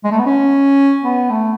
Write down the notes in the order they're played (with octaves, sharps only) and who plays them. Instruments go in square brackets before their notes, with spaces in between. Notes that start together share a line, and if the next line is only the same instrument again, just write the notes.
[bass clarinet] G#3
A3
B3
C#4
B3
A3